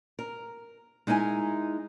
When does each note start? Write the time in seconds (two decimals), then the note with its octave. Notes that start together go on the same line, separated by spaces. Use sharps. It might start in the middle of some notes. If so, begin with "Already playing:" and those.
0.19 A#4
1.07 G#3 D#4 E4 A#4 G#5